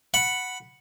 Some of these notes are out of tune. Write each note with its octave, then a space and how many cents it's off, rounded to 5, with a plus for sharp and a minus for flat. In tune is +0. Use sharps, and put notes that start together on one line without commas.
F#5 +0 B5 +0